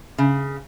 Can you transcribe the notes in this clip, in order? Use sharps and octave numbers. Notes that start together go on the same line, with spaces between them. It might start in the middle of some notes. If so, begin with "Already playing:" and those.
C#3